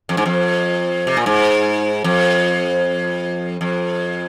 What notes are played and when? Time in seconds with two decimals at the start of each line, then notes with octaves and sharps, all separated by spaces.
0.09 F2
0.17 G#2
0.26 F2
1.07 C3
1.17 A#2
1.26 G#2
2.04 F2
3.61 F2